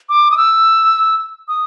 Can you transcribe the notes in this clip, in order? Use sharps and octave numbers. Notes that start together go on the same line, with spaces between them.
D6
D#6
E6
D#6